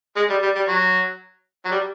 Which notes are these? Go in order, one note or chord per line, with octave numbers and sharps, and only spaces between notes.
G#3
G3
G3
G3
F#3
F#3
G3